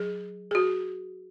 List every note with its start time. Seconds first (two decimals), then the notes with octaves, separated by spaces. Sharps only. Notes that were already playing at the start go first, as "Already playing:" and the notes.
Already playing: F#3 G#4
0.51 G#4
0.55 F#4